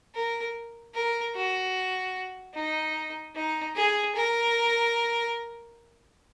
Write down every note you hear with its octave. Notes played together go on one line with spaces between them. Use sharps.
A#4
A#4
F#4
D#4
D#4
G#4
A#4